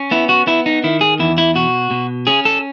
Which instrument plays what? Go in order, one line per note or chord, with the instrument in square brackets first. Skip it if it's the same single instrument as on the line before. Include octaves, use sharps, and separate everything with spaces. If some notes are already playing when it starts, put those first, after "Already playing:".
Already playing: [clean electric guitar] C#4
B3 E4
F#4
B3 E4
D#4
D#3 E4
G#4
E2 E4
E4
B2 F#4
B2
C#4 G#4
A4